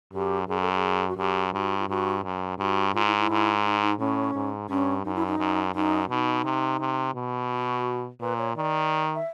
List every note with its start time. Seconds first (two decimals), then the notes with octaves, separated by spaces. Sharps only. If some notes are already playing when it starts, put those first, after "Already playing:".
0.13 F#2 G4
0.48 F#2 G#4
0.61 A4
0.73 G#4
1.08 F#4
1.18 F#2 G4
1.53 G2 F#4
1.79 F4
1.88 G2 F#4
2.24 F#2
2.58 G2 F#4
2.94 G#2 F4
3.06 E4
3.17 E4
3.29 G#2
3.64 D#4
3.82 D#4
3.99 A2 C#4
4.34 G#2
4.69 G2 C#4
5.05 F#2 D#4
5.15 E4
5.27 D#4
5.39 F#2
5.75 F#2 D#4
6.09 B2 D#4
6.45 C3
6.80 C3
7.15 B2
7.50 F#4
8.20 A#2 B4
8.38 C#5
8.55 D#3 D5
9.14 E5